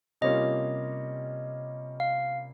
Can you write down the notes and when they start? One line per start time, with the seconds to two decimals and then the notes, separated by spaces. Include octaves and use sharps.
0.21 C3 G3 A#3 C#4 F4 D#5
2.00 F5